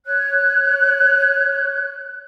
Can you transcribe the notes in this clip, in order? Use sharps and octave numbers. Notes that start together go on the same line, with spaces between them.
C#5 F#6